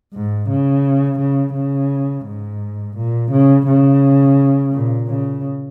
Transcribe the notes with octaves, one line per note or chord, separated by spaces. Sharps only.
G#2
C#3
C#3
C#3
G#2
A#2
C#3
C#3
A#2
C#3